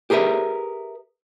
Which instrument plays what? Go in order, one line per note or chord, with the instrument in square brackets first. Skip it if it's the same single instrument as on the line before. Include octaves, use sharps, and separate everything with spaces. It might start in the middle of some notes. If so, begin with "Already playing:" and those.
[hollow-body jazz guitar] G4 G#4 A#4 B4 E5